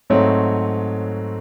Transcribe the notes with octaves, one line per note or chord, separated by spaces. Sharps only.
G#2 F#3 A3 C4 C#5